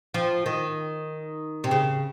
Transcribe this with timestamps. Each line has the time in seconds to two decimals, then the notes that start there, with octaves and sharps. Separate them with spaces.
0.14 F3
0.46 D#3
1.64 C3
1.71 C#3